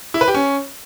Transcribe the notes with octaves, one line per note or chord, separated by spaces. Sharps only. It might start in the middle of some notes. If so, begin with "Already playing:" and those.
E4
B4
G4
C#4